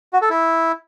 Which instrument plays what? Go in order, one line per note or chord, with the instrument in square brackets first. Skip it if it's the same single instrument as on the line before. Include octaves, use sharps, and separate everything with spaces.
[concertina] F#4
A4
E4